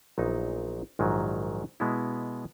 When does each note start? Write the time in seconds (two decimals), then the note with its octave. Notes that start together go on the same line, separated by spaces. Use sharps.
0.18 A#1 A#2 F#3 B3 D#4
0.99 A#1 G#2 D#3 F#3
1.80 B2 G#3 B3 E4